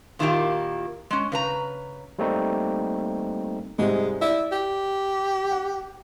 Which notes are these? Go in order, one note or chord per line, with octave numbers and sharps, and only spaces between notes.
A#2 D#3 A#3 E4 F4 G4
G#3 C#4
C#3 B4 A#5
G3 A3 A#3 C4 D#4
G#2 C3 G3 G#3
E4 D5
G4
F#5